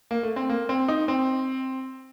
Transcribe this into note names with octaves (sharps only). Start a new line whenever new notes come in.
A#3
A3
C4
A#3
C4
D#4
C4